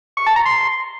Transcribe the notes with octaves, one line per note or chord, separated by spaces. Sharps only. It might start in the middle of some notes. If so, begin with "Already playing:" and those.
C#6
A5
A#5
C6